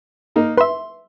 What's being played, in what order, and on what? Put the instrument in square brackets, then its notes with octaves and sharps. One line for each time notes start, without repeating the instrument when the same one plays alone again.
[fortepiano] A#3 D#4 A#4
[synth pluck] B4 E5 [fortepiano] C6